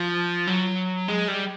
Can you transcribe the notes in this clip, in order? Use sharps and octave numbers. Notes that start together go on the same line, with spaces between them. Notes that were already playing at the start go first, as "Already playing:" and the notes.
Already playing: F3
F#3
G#3
G3